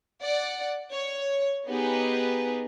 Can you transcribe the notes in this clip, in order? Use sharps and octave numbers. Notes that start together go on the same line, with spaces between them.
D5 F#5
C#5
B3 D#4 G4 G#4 B4